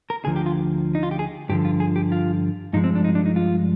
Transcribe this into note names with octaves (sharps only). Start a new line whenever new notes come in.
A#4
D2 D3 F3 G#4
G4
F4
D#4
F4
G4
G#4
G2 D3 F3 G4
F4
G#4
G4
F4
G2 F3 G#3 D#4
C4
D4
D#4
D4
D#4
F4